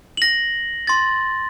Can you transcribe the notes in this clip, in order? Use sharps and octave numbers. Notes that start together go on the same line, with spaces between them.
A#6 F#7
C6 A6